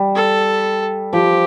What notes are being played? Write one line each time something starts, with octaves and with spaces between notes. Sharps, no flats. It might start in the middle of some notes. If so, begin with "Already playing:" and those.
Already playing: G3
A4
F3 G4